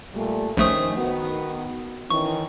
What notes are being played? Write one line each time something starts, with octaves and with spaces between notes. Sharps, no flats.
A#2 G3 A3
A#1 D#3 A3 C#4 C5 D#6
D#3 B3 F#4
D#3 E3 C#4 C#6